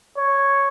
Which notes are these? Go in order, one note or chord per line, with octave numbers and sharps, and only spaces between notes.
C#5